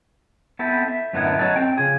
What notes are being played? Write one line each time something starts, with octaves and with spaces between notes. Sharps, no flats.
B3 C4 E4 A4
E5
F#2 A2 D3 B3 D#4 E4
F#3 D#4 A4
C4 G5
C#3 F3 G#4